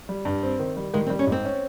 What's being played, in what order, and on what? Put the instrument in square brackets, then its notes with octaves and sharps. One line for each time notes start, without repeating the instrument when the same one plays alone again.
[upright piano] G3
G2
C4
D#3
G3
[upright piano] D#3 [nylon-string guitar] G#3
[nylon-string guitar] C4
[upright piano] G3
[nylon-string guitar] C#4
[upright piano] G#2 [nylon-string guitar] C4
[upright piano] C#4